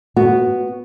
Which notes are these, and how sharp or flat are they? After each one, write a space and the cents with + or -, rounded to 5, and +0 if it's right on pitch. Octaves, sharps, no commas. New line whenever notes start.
B3 +0 F#4 +0